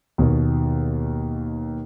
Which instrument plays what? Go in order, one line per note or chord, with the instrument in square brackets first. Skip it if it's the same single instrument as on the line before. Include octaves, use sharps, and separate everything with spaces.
[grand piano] D#2 B2